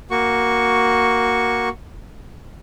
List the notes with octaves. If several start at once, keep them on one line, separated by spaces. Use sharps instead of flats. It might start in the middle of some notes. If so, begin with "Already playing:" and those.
A#3 F#4 C#6